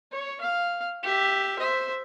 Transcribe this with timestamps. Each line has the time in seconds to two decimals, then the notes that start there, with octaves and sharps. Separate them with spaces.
0.11 C#5
0.41 F5
1.03 G4 E5
1.59 C5 E5